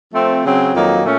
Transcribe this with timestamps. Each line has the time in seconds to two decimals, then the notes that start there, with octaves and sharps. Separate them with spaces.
0.12 F3 A3 C4
0.42 C#3 F#3 C4
0.72 F2 D#3 F#3 A#3
1.02 A#2 A3 C#4